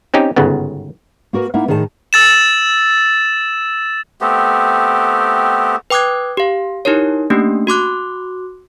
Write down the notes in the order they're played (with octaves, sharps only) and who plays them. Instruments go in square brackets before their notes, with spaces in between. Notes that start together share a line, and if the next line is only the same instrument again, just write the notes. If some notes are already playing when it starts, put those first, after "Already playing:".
[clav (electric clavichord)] C4 C#4 D#4 G4
G1 G#2 C#3 B3
[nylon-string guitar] A#3 F#4 A#4 B4
A#3 D#4 E4 A#4 E5 F#5
A2 D#3 D#4 G#4 E5 A5
[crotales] E6 A6 E7
[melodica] A3 B3 C4 G4
[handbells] B4 G5 D6 D#6 F#6 G#6
G4 F5
D#4 E4 G4 A#4 C#5
A3 A#3 C#4 D4 G4
F#4 C6 D6 F#6